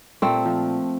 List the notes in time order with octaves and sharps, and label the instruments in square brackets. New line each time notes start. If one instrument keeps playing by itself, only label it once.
[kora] A#2 A3 C4
F3